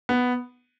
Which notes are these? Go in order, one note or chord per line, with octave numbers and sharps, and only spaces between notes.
B3